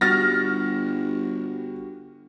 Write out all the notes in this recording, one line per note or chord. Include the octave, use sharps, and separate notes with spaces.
G1 G3 F#4 F6 A6 A#6